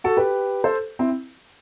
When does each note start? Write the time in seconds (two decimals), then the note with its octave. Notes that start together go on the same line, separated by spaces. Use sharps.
0.04 F#4 A4
0.17 G4 B4
0.64 A4 C5
0.99 C4 E4